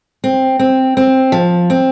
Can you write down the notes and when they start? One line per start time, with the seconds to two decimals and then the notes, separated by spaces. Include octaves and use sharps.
0.24 C4
0.59 C4
0.97 C4
1.32 F3
1.70 C4